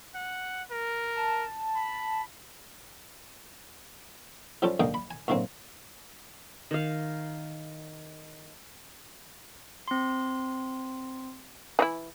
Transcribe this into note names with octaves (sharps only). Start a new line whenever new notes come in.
F#5
A#4
A5
B5
F3 G3 C#4 F4 G4 A4
C#2 D3 G#3 A#3 G5 D#6
B5
G#5
F#2 A2 D3 A#3 C4
D#3 F5
C4 C6
E3 D#4 E4